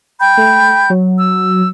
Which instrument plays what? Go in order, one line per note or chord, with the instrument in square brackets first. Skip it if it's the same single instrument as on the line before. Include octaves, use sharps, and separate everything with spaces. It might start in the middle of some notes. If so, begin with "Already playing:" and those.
[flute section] G5 B5 G6
[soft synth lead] A3
F#3
[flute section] E6